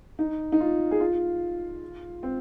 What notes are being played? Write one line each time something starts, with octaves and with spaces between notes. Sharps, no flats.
D#4
D#4
F4
G#4
F4
C4